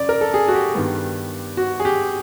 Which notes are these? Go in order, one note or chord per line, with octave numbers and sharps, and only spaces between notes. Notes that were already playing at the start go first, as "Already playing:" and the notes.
Already playing: F#2 C#3 D5
A#4
A4
G#4
F#4
G4
G2 D#3 G3 B3
F#4
G#4
G4